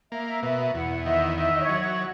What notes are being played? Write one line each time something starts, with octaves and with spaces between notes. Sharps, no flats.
A#3 E5
E5
B2 E5
E5
E2 F#5
D#3 E5
D#3 E5
D#5
C#5
F#3
C#5